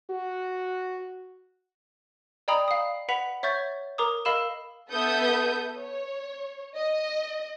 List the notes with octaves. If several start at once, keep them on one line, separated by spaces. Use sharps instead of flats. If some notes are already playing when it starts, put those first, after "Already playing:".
F#4
D5 D#5 G5 A#5 B5 D#6
F5 D#6
B4 F#5 B5 B6 F7
C#5 E5 C#6 G6 A6
A#4 A#5 D6 D#6
A#4 D#5 F5 B5 E6 E7
B3 A4 B4 E5 D#6 G6
C#5
D#5